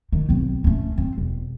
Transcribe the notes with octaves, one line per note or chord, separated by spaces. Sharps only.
D#3
B1 C4
A3 C#4
C4
E1